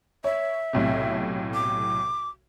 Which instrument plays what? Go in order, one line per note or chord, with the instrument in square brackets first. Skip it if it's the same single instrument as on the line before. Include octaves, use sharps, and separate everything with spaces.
[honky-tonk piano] C#5 [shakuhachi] E5
[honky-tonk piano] B1 A2 C3
[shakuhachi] D6